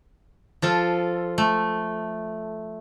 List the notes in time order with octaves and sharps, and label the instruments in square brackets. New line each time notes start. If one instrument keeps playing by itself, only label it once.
[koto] F3 F4 A4
A3